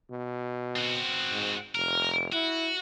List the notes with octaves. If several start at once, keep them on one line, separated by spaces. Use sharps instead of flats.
B2
C4 F#4
G#2
F1 A#4
E4 F#4